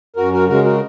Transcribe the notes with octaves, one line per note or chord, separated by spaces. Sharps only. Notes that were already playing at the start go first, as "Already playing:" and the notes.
F#2 F#4 A#4
F#4 A#4
C#3 G#3 F#4 A#4
F#4 A#4